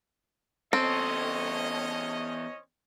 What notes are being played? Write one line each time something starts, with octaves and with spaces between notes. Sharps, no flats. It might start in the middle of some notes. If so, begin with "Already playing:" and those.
E2 C4 C#4 A4 D#5